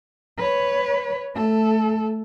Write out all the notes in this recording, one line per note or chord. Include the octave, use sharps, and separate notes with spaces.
B4 C#5
A3 A4